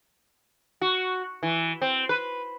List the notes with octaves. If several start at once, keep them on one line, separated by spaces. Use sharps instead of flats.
F#4
E3
C4
B4